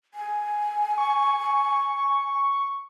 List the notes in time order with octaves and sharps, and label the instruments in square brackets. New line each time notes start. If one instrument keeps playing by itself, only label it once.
[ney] G#5
[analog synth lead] C#6